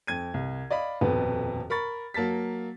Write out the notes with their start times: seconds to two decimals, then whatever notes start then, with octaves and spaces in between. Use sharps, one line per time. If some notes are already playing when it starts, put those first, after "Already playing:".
0.07 F2 G#6 D#7
0.34 C2
0.71 D5 D#5 F5 B5
1.01 D#1 F2 B2 B3 B4
1.70 A#4 B5 C#6 A6
2.14 F#3 A#3 A5 A6 B6